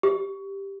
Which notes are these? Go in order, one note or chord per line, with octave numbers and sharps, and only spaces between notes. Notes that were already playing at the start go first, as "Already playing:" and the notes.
G4